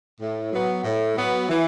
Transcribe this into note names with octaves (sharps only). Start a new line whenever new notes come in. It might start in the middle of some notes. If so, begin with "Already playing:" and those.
A2
F#3 B3
A2
F#3 B3
E3